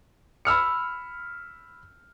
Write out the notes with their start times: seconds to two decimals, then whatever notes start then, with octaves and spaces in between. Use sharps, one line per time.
0.45 B5 E6 F6 C#7